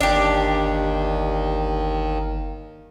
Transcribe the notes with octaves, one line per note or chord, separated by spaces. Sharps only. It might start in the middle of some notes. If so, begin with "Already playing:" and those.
G1 D#2 D#3 D4 G4